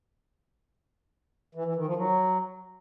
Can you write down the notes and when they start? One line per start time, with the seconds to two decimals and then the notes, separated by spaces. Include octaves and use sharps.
1.55 E3
1.65 E3
1.76 D#3
1.86 F3
1.97 F#3